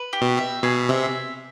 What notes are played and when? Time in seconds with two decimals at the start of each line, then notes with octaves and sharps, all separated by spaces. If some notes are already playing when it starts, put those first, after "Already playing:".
Already playing: B4
0.13 G4
0.21 B2
0.38 E5
0.63 B2 G#4
0.89 C3 E5